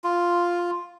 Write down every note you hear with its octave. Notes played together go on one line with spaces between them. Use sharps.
F4